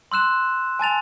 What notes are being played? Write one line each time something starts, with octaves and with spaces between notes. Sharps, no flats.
C6 E6 F#6 E7
G#5 A5 A6 F7